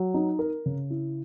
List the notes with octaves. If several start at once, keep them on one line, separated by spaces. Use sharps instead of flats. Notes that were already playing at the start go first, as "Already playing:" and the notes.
Already playing: F#3
D#4
A#4
C#3
E4